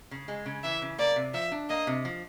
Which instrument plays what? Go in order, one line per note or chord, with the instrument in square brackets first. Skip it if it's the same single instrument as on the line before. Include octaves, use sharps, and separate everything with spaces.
[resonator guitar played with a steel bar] C#3
G#3
C#3
[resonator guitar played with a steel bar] E3 [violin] E5
[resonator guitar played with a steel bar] C#3
[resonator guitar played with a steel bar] A#3 [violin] D5
[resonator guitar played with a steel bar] C3
[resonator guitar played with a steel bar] F3 [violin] E5
[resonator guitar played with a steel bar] D4
[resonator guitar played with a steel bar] A#3 [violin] D#5
[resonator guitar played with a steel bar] C3
F3